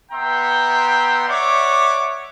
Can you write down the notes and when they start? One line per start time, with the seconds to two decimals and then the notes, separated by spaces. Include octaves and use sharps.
0.12 B3 E5 G5 A#5 C6
1.28 C#5 D5 E5 F#5 D6